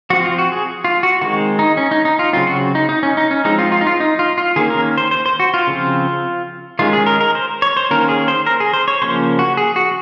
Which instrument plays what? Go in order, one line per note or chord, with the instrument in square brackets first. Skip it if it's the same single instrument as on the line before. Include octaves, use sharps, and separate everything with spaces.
[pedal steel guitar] F3 C4 F#4
F4
F#4
G#4
F4
F#4
D#3 G#3 C4 F#4
D#4
C#4
D#4
D#4
F4
C#3 F#3 C4 F4
F#4
D#4
D#4
C#4
D#4
C#4
F3 G#3 C4 D#4
F4
F4
D#4
F4
D#4
F4
F4
D#3 A#3 C#4 G#4
A#4
C5
C5
C5
F#4
F4
C#3 F3 C4
D#3 G#3 C#4 F4
G#4
A#4
A#4
C5
C#5
C5
D#3 A#3 C#4 A#4
G#4
C5
A#4
G#4
C5
C#5
C#3 F3 A#3 C#4 C5
F#4
G#4
F#4